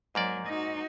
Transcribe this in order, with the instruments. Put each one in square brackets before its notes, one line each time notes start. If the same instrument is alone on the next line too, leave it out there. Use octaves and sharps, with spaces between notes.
[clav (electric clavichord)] G#2 A#3 D5 [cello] F#3
[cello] D#4 F#4